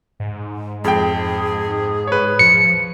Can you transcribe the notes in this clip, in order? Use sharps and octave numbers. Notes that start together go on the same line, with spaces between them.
G#2
F2 G#4 G5
B4 C#5
F3 C#7